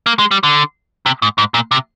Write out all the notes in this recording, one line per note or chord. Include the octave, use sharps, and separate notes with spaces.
A#3
G#3
G3
D3
C3
G#2
G#2
A#2
C3